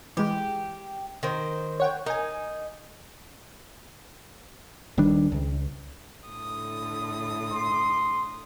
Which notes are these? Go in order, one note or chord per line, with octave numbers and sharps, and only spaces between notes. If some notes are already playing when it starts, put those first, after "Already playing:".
E3 G#3 G4
D#3 A#4 C5
C#5 F#5 G5
D#4 A#4 G#5
D#1 D#3 G3 D4
C#2
A2 D3 D#6
C6